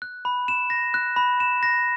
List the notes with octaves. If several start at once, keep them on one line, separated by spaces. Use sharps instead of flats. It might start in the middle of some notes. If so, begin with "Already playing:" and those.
F#6
B5
E7
A#6
F#6
B5
E7
A#6